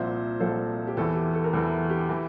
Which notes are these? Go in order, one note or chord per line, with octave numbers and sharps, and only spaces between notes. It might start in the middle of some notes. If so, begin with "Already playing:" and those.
Already playing: C2 A#2 F3 C5 E5
C2 A#2 F3 A4 C5
G4
E2 E3 A4
G4
A4
A#4
E2 E3 A4
G4
E3